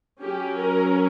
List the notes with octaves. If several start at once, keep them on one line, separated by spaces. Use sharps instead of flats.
F#3 C#4 G4
A#4